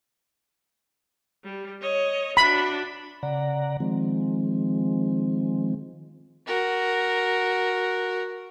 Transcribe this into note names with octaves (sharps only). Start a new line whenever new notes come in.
G3
C#5 D#5
D4 F#4 B5
C#3 D5 F#5 A#5
D#3 F3 G#3 C4
F#4 A#4